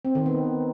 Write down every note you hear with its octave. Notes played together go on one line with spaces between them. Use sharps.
C4
D#3
B3